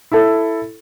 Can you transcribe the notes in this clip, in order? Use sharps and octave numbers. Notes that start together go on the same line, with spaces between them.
E4 A4